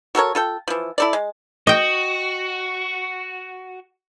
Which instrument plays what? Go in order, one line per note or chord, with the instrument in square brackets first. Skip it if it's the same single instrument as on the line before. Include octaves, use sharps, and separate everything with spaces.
[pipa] F#4 A4 A#4 C#5
F4 A4 G5
E3 F3
E4 A4 D5
G#3
[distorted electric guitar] F#4 [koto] D#5 G5